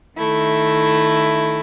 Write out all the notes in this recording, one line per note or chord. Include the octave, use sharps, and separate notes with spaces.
D#3 A3 E4